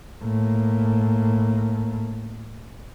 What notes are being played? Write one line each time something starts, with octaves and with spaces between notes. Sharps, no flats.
A2 A#3